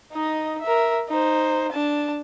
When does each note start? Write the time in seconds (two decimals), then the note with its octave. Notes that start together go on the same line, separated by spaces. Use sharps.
0.12 D#4 D#5
0.62 A#4 E5
1.09 D#4 C5
1.73 D4 A5